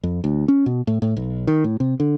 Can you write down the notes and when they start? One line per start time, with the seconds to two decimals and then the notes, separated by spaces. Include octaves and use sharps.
0.03 F2
0.24 D2
0.48 C#4
0.66 B2
0.87 A2
1.02 A2
1.17 B1
1.47 D#3
1.64 A2
1.80 C3
2.00 D3